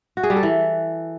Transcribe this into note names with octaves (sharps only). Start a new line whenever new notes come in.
F#4
G#4
G3
A4
E3